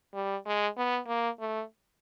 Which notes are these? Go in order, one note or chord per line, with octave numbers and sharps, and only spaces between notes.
G3
G#3
B3
A#3
A3